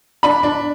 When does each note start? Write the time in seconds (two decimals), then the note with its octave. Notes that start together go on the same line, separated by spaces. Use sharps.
0.23 D4 B5
0.43 D4